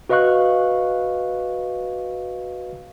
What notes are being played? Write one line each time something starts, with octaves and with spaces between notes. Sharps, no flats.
F#4 B4 D#5 F5 C#6 F#6